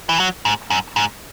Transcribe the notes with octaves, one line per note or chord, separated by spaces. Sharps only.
E3
F#3
G#2
F#2
G#2